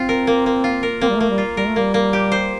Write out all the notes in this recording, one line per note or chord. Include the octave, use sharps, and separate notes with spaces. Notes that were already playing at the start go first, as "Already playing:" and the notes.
Already playing: C4 F4
A#4
A#3
A#3
F4
A#4
A#3 C4
G3
A3
A#3
G3
F4
G3 A#4
A3
G3 A#3
A#3
G4
C5